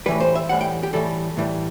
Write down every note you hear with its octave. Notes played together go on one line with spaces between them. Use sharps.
A2 E3 G3 B4
C5
E5
A2 E3 G3 F#5
G5
G4
A2 E3 G3 A4
A2 E3 G3